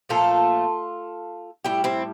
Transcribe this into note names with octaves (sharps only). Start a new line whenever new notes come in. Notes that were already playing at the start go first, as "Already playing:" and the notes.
A#2 F3 A3 F4 A4
A2 G3 E4 G4
C4 E4